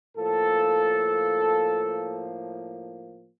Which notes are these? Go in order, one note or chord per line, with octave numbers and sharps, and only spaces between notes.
A2 F3 A#3 A4